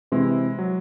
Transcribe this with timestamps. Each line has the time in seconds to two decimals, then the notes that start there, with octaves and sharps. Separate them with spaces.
0.12 C3 E3 G#3 C4 E4
0.59 F#3